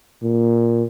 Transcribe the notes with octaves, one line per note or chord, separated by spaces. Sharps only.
A#2